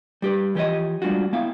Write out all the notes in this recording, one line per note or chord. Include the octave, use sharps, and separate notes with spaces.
G3 G4 B4
E3 F3 G4 A4 C#5 D#5
G3 G#3 D4 F4 F#4
A#3 B3 E4 E5 F5